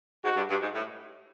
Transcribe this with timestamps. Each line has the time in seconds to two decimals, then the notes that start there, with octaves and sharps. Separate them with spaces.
0.24 G#2 F#4
0.37 G2
0.50 G2
0.61 G#2
0.74 A2